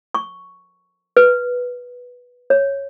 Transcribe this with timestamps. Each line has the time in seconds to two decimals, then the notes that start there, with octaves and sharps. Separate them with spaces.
0.15 C#6
1.17 B4
2.50 C#5